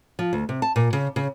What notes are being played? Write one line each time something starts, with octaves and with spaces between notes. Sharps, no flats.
F3
D2
C3
A5
A#2
C#3
C#3